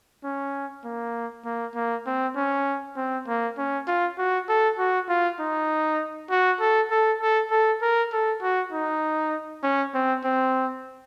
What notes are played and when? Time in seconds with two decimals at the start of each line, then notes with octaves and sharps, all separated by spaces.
0.24 C#4
0.85 A#3
1.45 A#3
1.75 A#3
2.06 C4
2.36 C#4
2.97 C4
3.28 A#3
3.58 C#4
3.87 F4
4.18 F#4
4.49 A4
4.78 F#4
5.09 F4
5.40 D#4
6.30 F#4
6.60 A4
6.91 A4
7.21 A4
7.51 A4
7.82 A#4
8.13 A4
8.42 F#4
8.72 D#4
9.63 C#4
9.95 C4
10.24 C4